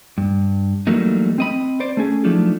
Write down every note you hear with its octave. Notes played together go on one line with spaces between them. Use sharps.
G2
E3 F#3 G3 A3 A#3 D#4
C4 D#5 B5
C5 D5
A3 C#4 G#4
F3 F#3 A3 D4 D#4 F4